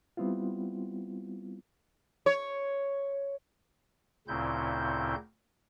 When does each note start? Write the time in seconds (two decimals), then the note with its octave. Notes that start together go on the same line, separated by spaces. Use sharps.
0.17 G3 B3 C4 E4 F4
2.26 C#5
4.28 D2 A#2 C#3 C4 E4 G6